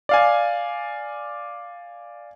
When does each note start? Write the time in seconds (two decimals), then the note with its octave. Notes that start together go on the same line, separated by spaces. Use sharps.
0.09 D5 F5 G#5